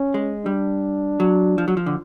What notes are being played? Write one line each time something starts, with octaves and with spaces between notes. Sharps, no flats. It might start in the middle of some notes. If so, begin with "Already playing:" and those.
Already playing: C#4
G#3
G3 D4
F#3
F3
F#3
F3
D3